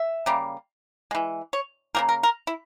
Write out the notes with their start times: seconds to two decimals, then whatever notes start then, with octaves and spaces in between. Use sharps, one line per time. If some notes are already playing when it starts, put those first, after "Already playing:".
Already playing: E5
0.26 C#3 G3 A#3
1.11 E3 G#3
1.53 C#5
1.95 C#3 G3 A#3 A#4
2.09 A#4
2.23 A#4
2.47 E4